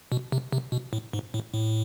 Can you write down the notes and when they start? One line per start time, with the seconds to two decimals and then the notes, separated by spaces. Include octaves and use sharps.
0.12 B2
0.32 C3
0.53 C3
0.72 B2
0.93 A2
1.13 G#2
1.34 A2
1.54 A2